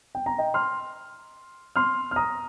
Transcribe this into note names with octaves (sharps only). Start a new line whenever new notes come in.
G5
A#5
D#5 G5
C6 F6
C6 F6
F6
A#5 D#6